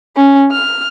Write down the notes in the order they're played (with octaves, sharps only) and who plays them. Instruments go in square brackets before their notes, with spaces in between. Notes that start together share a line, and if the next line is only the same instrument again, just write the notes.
[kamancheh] C#4
F6